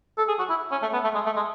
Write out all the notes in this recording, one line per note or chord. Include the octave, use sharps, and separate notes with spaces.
A4
G#4
F#4
E4
C#4
A3
B3
A3
G#3
A3
G#3